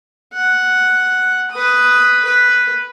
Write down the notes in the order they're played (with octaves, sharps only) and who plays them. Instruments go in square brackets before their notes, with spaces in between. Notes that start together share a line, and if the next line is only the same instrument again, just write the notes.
[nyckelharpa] F#5
B4 D#6
B4